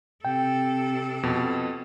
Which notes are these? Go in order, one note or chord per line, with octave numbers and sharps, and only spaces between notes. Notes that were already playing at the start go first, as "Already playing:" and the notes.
C3 A4 G5
F2 B2